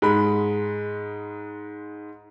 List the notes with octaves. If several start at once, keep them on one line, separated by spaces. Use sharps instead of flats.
G#2 G#3 B5